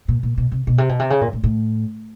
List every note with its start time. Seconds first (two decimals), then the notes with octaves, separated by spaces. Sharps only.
0.08 A#2
0.23 A#2
0.38 B2
0.52 C3
0.67 B2
0.78 C3
0.89 B2
0.99 C3
1.10 C#3
1.21 A#2
1.33 A2
1.43 A2